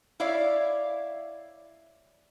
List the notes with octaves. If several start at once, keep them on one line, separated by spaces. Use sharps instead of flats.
E4 C#5 D5 E5 F5